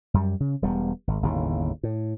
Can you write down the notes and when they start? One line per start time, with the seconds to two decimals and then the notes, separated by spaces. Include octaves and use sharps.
0.14 F#2 G3
0.40 C#3
0.62 E1 G3 A#3 B3
1.07 G#1
1.23 G1 D#2 A2 C#3
1.83 A2